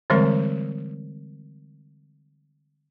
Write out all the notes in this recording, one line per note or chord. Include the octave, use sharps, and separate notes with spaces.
D3 E3 G3 G#3 C4 A#4